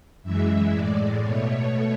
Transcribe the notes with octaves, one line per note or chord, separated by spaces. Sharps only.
F#2 E3 G#3 E5
A2 G#3 D5
B2 A3 C#5